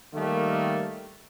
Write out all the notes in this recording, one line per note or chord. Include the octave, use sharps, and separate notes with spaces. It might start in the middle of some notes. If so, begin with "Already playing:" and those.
D#3 G3 A3 A#3